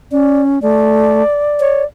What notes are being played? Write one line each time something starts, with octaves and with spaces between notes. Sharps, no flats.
C#4 D5
A3 D5
C#5